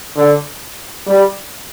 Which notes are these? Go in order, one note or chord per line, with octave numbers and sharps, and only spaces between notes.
D3
G3